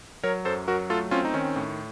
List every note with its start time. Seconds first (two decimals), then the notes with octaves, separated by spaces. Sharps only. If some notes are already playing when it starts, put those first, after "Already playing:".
0.23 F#3 A#4 C#5
0.45 F#2 A4 C5
0.67 F#3 F#4 A#4
0.90 A3 F4 A4
1.11 C4 C#4 F4
1.25 D#4
1.34 D#3 C#4
1.56 A2